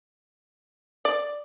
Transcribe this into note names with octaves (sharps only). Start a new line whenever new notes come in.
D5